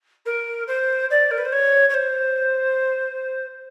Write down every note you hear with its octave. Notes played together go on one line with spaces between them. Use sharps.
A#4
C5
D5
A#4
B4
C5
C#5
C#5
C5